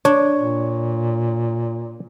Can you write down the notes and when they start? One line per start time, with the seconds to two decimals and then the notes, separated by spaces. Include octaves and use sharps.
0.05 D4 C#5
0.37 A#2